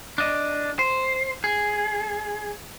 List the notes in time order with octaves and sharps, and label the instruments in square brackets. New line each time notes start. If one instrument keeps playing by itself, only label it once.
[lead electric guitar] D4 D#5
C5
G#4